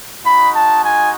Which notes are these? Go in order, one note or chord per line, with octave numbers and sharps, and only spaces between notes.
G#3 D#4 F#4 B5
A5
G#5